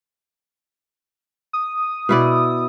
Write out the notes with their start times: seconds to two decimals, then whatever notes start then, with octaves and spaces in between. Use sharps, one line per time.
1.53 D#6
2.09 B2 E4 D5